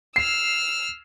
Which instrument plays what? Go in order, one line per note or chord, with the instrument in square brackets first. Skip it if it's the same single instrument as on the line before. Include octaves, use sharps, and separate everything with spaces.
[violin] E6 F6 [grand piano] C7